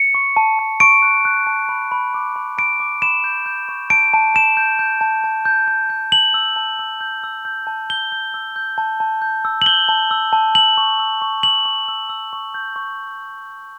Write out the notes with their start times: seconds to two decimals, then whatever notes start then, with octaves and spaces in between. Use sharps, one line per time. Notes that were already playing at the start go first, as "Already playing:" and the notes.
Already playing: C#7
0.15 C#6
0.37 A5
0.59 A5
0.80 C#6 D7
1.02 F#6
1.25 F#6
1.47 A5
1.69 B5
1.92 B5
2.14 D6
2.36 B5
2.58 B5 D7
2.80 D6
3.02 B5 E7
3.24 G6
3.46 G6
3.69 C#6
3.90 A5 D7
4.14 A5
4.35 A5 E7
4.57 G6
4.79 G6
5.01 A5
5.24 A5
5.45 G6
5.68 G6
5.90 G6
6.12 A5 F#7
6.34 E6
6.56 A5
6.79 E6
7.01 G6
7.24 E6
7.45 G6
7.67 A5
7.90 G6 G7
8.12 G6
8.34 E6
8.56 G6
8.78 A5
9.00 A5
9.22 G6
9.45 E6
9.62 F#7
9.66 G6 G7
9.89 A5
10.11 E6
10.33 A5
10.55 E6 F#7
10.77 C#6
10.99 E6
11.22 C#6
11.43 C#6 F#7
11.65 C#6
11.88 E6
12.09 E6
12.33 C#6
12.54 G6
12.76 C#6